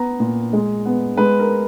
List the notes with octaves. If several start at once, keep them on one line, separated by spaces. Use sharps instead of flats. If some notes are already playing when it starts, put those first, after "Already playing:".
Already playing: B3 A#5
A#2
G#3
B3
G#3 B4
A#4